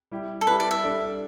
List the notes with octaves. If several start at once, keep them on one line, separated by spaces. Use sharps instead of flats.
G3 E4 G4
A4
G3 E4 G4 B4
D5
E5
G3 D4 A4 D5